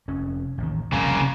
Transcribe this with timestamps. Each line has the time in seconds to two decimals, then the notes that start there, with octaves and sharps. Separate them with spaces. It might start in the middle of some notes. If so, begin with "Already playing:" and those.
0.08 F1 F2 C#4
0.58 A1 D#2 D#3
0.93 F1 C2 C#3 A#3